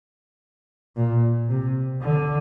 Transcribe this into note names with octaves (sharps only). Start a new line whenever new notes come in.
A#2
C3
D3